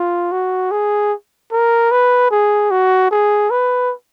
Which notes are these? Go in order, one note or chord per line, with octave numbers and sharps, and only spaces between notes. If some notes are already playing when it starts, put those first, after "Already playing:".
Already playing: F4
F#4
G#4
A#4
B4
G#4
F#4
G#4
B4